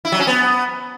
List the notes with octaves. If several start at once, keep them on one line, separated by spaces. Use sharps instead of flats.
E4
F#3
C#4
B3